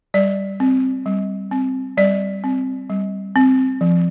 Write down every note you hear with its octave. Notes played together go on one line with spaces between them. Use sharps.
G3 D5
C4
G3
C4
G3 D5
C4
G3
C4
F3